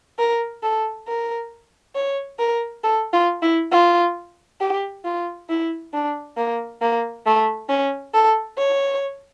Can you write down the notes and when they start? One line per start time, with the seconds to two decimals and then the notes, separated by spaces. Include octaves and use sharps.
0.19 A#4
0.63 A4
1.07 A#4
1.95 C#5
2.39 A#4
2.84 A4
3.13 F4
3.42 E4
3.72 F4
4.61 G4
5.05 F4
5.49 E4
5.93 D4
6.37 A#3
6.82 A#3
7.26 A3
7.69 C#4
8.14 A4
8.58 C#5